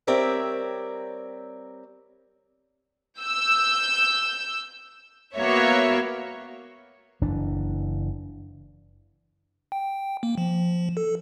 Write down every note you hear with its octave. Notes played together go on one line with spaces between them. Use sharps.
G3 C4 A#4 C#5 D5 E5
E6 G6
A#3 B3 F#4 C#5 E5
F#1 E3 D4
G5
A#3
F3
A4